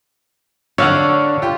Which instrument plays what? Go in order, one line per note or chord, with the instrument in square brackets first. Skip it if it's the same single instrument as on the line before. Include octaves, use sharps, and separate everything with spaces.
[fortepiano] D3 [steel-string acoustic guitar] D4 [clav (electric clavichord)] C#5 F5 F#5
[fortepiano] F4 G4